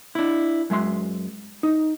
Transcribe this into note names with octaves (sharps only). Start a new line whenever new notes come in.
D4 E4
F#2 G#3 E5 C6
D#4